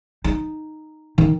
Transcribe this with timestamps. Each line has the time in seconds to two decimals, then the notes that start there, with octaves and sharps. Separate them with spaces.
0.24 D#4
1.18 D#3